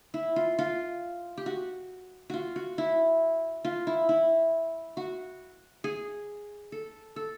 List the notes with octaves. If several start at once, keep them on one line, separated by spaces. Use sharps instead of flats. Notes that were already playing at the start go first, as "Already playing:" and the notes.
E4
F4
F4
G4
F#4
F4 F#4
F#4
E4
F4
E4
E4
F#4
G#4
A4
A4